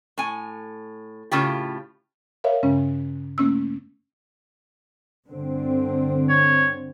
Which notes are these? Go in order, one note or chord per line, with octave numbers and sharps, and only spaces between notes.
A2 G#5
A2 C#3 F4 G4
A#4 C#5 E5 F5
G2 C#3 G#3 C#4
A3 A#3 C#4 E6
G2 D3 C4
C#5